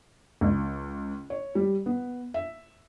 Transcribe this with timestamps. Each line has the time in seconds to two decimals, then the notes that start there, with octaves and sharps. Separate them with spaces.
0.41 C#2
1.30 C#5
1.55 G3
1.86 B3
2.34 E5